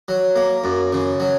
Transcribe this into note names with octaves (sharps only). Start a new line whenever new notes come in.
F#3
A#3
F#2
C#3
F#3